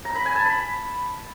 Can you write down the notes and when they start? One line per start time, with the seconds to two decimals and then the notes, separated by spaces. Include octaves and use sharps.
0.05 A#5
0.15 B5
0.25 G#5
0.36 A5
0.46 B5